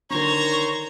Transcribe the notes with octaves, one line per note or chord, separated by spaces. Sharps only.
D3 D#3 C5 C#5 A#5 C#6